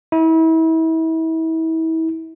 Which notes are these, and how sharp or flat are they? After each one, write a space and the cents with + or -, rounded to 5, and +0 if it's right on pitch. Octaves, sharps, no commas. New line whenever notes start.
E4 -35